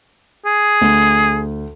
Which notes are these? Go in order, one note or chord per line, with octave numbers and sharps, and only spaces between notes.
G#4
D2